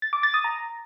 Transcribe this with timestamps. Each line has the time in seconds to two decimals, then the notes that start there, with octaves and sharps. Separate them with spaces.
0.02 A6
0.13 D6
0.23 A6
0.34 D#6
0.44 A#5